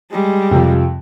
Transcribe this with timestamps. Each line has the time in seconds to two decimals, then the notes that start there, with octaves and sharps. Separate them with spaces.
0.12 G3 G#3
0.51 F2 C3 F3